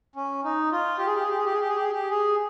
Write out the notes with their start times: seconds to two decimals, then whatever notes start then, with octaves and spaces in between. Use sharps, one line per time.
0.16 C#4
0.44 D#4
0.72 F4
0.99 G4
1.07 G#4
1.15 G4
1.22 G#4
1.29 G4
1.37 G#4
1.45 G4
1.52 G#4
1.61 G4
1.69 G#4
1.76 G4
1.83 G#4
1.92 G4
2.10 G#4